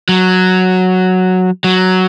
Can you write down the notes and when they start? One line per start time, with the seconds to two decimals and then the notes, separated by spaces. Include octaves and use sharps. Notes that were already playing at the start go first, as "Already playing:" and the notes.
0.09 F#3
1.64 F#3